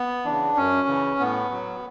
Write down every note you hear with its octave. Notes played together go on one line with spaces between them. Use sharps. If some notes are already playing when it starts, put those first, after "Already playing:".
Already playing: B3
C#3 E3 D4
F#2 C#4
C#3 E3
A2 B3
F#3